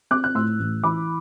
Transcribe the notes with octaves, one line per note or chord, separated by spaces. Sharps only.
C4 D6 F#6
F#6
A2 C6 E6
A1
E3 B5 D6